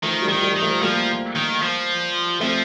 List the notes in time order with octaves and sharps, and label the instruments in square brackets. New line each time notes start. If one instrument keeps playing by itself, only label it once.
[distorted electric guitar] D#3 [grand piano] F3 A3
[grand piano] G3
[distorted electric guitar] D#3
[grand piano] G3
[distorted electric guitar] D#3
[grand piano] F3 A3
[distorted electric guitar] F3 [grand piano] G3 A#3
[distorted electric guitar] D#3
F3
[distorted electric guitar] F3 [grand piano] A3 C4